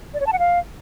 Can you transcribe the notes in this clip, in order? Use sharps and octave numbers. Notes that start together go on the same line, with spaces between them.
D5
C#5
A5
F#5
F5